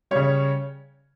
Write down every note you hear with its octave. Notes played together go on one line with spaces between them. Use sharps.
C#3 G3 C#5